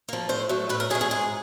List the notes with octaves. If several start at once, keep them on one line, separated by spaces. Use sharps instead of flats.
F3 A#3
A2 C5
F#3 A3
A2 B4
A#4
F#3 A3 G#4
G#4
G#2 G#4